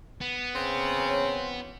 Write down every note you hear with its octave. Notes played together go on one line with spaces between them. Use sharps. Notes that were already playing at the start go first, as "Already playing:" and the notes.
B3
C#3 C4
E3 F#3 C#4